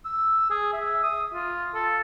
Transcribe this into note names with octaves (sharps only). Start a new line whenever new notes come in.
E6
G#4
E5
D#6
F4
A4